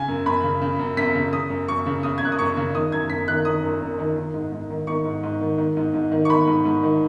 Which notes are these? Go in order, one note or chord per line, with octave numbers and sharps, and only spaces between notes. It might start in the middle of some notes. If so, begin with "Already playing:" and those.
Already playing: C#3 G#5
F#2
F#2 B5
C#3
C#3
F#2
F#2 B6
C#3
C#3 D#6
F#2
F#2 C#6
C#3
C#3 D#6
G#6
F#2 F#6
D#6
F#2 C#6
C#3
D#3 D#6
F#2 G#6
F#2 B6
D#3 F#6
D#3 D#6
F#2
F#2
D#3
D#3
G#2
G#2
D#3
D#3 C#6
G#2
G#2
D#3
D#3
G#2
G#2
D#3
C#6
D#3 B5
G#2
G#2
D#3